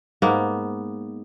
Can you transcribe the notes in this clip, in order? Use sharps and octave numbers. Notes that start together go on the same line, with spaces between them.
G#2 A#3 B3